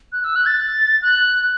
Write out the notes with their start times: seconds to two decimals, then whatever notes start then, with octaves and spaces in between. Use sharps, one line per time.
0.13 F#6
0.24 E6
0.36 F#6
0.46 A6
1.02 F#6